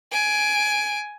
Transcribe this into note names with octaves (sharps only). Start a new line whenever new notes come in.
G#5 D7